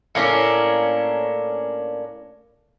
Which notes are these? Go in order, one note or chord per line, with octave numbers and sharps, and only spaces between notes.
A2 A#3 C#4 D4